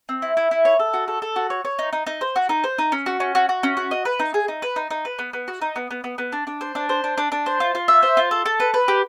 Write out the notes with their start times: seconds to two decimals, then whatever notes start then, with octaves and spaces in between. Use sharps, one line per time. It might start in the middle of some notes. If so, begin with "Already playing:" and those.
0.09 C4
0.22 E4
0.37 E4
0.51 E4
0.65 C#5
0.79 A4
0.94 F#4
1.08 A4
1.22 A4
1.36 F#4
1.50 C#5
1.65 C#5
1.79 D#4
1.93 D#4
2.07 D#4
2.21 C5
2.36 F#4
2.49 D#4
2.64 C5
2.79 D#4
2.92 C#4
3.06 F#4
3.20 C#4
3.35 F#4
3.49 F#4
3.63 C#4
3.77 F#4
3.91 D#5
4.05 B4
4.19 D#4
4.34 G#4
4.48 D#4
4.62 B4
4.76 D#4
4.91 D#4
5.05 B4
5.19 B3
5.33 B3
5.48 F#4
5.62 D#4
5.76 B3
5.91 B3
6.04 B3
6.18 B3
6.32 D4
6.47 D4
6.61 C5
6.75 D4
6.89 C5
7.04 D4
7.18 D4
7.32 D4
7.46 C5
7.60 F4
7.75 F4
7.88 E5
8.03 C5
8.17 F4
8.31 A4
8.46 A4
8.60 B4
8.74 B4
8.88 G4